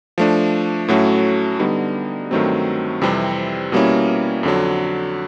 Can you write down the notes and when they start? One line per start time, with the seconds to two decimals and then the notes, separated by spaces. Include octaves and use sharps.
0.18 F3 A3 D4
0.88 A2 F#3 A3 C#4 F#4
1.59 D3 G3 B3 D#4
2.31 G2 D#3 F#3 A3 C4
3.01 F2 C3 E3 G3 C4
3.72 B2 G3 A#3 C#4 E4
4.43 F2 D3 F#3